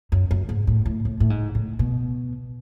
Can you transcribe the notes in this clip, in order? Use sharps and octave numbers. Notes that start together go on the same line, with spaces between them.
F#2
F#2
G#2
A2
A2
A2
A2
G#2
A2
B2